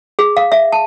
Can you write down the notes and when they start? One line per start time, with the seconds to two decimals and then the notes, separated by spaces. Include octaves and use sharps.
0.19 G#4
0.37 F5
0.52 E5
0.72 A5